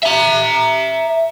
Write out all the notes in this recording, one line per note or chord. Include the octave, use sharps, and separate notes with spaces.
E5 A#5